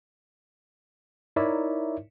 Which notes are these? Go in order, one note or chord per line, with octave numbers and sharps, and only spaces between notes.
D#4 E4 A#4 C#5 D5 E5